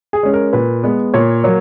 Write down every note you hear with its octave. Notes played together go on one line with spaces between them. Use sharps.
G#4
G#3 C#4
A#4
A#2 B4
G#3 B3
A#2 C#5
F#3 A#3